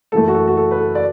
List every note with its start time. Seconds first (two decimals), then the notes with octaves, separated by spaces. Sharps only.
0.12 F#2 E3 A3 A4
0.28 F#4
0.34 A4
0.47 F#4
0.57 A4
0.71 B4
0.79 A4
0.95 D5